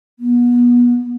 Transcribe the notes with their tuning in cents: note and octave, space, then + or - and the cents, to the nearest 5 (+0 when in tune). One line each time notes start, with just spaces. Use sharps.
B3 -30